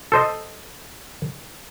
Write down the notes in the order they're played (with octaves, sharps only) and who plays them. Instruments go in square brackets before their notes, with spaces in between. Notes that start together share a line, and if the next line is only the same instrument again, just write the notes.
[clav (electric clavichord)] A4 C5 D#5